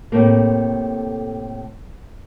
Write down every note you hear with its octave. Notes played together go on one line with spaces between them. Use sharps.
A2 C3 A3 A#3